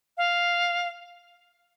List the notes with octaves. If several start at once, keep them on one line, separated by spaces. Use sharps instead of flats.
F5